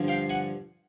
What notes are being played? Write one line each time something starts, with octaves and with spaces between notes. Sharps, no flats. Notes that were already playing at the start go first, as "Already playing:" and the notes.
Already playing: G2 D3 F3
F5 G5
F#5 G#5